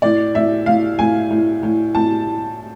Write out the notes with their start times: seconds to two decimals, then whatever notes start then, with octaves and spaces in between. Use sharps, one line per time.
0.02 A2 D5
0.34 A2 E5
0.66 A2 F5
0.99 A2 G#5
1.30 A2
1.63 A2
1.95 A2 A5